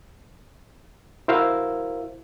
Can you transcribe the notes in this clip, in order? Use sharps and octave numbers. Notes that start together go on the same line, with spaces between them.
E4 F#4 A#4 C5 E5 F5